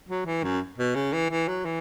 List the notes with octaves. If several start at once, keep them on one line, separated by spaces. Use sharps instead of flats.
F#3
E3
F#2
B2
C#3
E3
E3
F#3
E3